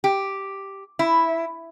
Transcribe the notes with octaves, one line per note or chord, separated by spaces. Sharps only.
G4
E4